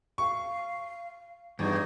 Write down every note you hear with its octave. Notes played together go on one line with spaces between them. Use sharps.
F5 C#6
E2 G2 D#4 G4 G#6